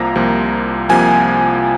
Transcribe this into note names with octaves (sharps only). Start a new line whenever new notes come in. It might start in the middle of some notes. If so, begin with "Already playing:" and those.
Already playing: C2 C3 F3 A#3 A#5
C2 C3 F3 A#3
C2 C3 F3 A#3 G#5